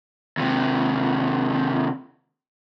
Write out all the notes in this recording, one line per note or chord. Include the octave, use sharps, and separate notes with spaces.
D#2 C3